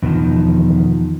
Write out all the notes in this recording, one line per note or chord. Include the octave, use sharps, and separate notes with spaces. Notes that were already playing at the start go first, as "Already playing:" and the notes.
E2 B2 D3 D#3 F3